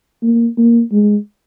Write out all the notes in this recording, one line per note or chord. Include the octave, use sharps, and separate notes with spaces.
A#3
A#3
G#3